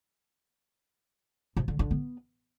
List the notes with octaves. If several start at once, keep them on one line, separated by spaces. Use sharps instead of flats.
C3
D3
D3
B3